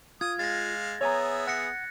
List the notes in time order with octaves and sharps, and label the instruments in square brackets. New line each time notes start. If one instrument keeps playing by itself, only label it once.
[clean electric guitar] F4 [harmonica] D#6 [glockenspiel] G#6
[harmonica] G#3 F5 [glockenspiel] A6 A#6
[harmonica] B3 G#4 E5 [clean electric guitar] C#5 G#5 A#5
[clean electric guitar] F#5 [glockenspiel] F#6 A#6 C#7